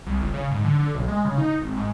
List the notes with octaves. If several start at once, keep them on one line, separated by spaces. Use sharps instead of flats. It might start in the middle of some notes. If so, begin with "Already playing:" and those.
C2
G1
C#3
G#2
D3
D3
B1
G#3
C#3
D#4
G#1
G#2